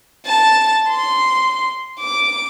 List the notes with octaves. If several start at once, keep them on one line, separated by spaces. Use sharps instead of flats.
A5
C6
D6